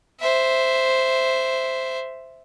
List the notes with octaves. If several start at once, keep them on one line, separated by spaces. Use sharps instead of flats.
C5 E5